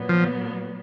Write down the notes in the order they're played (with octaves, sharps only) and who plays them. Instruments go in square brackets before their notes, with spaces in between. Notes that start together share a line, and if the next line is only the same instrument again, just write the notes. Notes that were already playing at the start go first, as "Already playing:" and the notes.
Already playing: [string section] A#2 F#3 B3
[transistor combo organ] F3